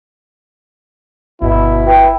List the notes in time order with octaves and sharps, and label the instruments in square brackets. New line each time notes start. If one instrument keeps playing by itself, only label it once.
[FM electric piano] G1 [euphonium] B2 [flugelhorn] E4
[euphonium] B4 [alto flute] G5